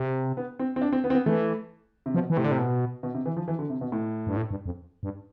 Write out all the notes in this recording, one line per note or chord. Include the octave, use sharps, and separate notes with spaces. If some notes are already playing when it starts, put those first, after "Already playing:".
Already playing: C3
B3
C4
C4
D4
C4
B3
C4
B3
E3 A3
C3
B2 F3
E3
A2 C3
D3
C3
B2
B2
C3
E3
F3
E3
D3
C3
B2
A2
G2
A2
G2
F2
G2